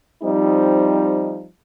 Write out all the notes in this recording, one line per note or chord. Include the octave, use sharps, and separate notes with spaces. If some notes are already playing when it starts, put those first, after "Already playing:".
F3 G3 C4 D#4